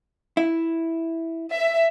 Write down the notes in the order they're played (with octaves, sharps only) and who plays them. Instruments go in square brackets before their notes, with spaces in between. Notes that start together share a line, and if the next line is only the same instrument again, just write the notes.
[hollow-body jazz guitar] E4
[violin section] E5